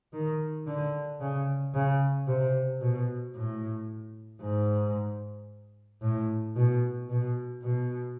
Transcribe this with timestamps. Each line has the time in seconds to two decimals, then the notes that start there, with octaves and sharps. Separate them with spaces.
0.13 D#3
0.67 D3
1.21 C#3
1.74 C#3
2.28 C3
2.81 B2
3.35 A2
4.42 G#2
6.02 A2
6.56 B2
7.09 B2
7.63 B2